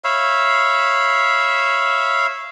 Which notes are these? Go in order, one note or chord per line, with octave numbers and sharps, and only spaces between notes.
C#5 E5 F5 B5